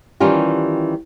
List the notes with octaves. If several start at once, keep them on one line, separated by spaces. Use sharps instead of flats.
D#3 E3 G3 C#4 F4 G4